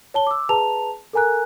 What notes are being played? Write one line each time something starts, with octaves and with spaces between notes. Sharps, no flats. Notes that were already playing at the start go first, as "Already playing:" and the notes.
C#5 A5 G7
D6 E6
G#4 B4 A5 A#5 F7
A4 A#4 G#5 A#5 F#6